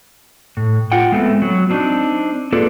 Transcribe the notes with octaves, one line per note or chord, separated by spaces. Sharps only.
A2
F4 F#5 G5
G#3 A3 B3 C4
F#3
C4 D4 D#4
A#3 F4 G#4 A4 B4 D5